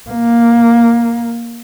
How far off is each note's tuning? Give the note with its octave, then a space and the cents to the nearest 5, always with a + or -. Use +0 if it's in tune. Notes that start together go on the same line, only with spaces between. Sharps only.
A#3 +5